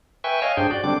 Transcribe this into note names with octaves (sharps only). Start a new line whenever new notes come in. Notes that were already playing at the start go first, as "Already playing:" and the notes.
B4 E5 G5 G#5 C#6
C#5 D#5 F5 G#5
G2 D4 G#4 C5 G5
F#4 D5
D3 G3 C4 D4 D6